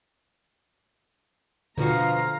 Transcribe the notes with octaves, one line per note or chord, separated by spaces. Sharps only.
B2 D3 F3 F4 F#4 F5 A#5